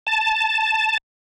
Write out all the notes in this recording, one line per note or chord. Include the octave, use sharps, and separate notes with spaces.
A5